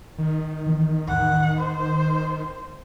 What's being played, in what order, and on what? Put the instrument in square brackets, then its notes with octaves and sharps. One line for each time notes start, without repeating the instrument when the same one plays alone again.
[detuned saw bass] D#3
[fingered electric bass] E3 B3
[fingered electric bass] E2 A2 [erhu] F#5
[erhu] C5